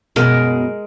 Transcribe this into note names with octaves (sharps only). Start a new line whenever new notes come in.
F#2 B2 G#3 A#4